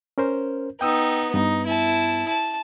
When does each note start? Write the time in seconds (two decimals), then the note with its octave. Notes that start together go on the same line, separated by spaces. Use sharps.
0.18 C#4 A#4 C5
0.81 B3 D#4 G5 D#6 E6
1.34 G2 B3 D#4
1.66 E4 A5
2.29 A5